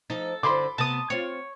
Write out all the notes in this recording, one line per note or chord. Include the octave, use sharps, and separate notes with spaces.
F3 D#4 A4
D3 C5 B5 C6 D6
C3 B3 A5 D#6
C4 F4 C#5